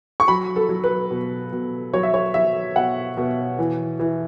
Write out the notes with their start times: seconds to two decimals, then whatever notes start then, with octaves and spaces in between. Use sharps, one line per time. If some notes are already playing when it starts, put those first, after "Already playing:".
0.20 C#6
0.28 F#3 B5
0.56 A4
0.69 F#3
0.84 B4
1.11 B2
1.53 B2
1.93 F#3 C#5
2.03 E5
2.14 C#5
2.34 F#3 E5
2.76 B2 F#5
3.17 B2
3.59 E3
3.99 E3